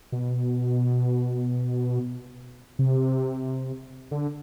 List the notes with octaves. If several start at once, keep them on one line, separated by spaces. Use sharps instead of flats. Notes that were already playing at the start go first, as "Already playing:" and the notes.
B2
C3
D3